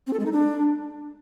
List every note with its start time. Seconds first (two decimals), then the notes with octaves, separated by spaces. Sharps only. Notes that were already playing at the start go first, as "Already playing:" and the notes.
0.07 C4
0.13 A4
0.20 G#3
0.26 D#4
0.32 D4